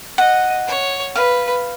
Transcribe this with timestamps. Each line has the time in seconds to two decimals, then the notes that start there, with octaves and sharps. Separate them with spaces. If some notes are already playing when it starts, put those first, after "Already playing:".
0.18 D#5 F#5
0.68 C#5
1.15 B4 F5